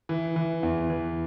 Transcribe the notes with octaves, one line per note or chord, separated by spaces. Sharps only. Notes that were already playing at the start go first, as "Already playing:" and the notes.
E3
E3
E2
E3